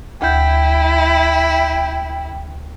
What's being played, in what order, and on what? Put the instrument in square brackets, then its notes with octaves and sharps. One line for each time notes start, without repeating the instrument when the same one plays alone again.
[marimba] D2 G6 [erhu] E4 [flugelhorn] G5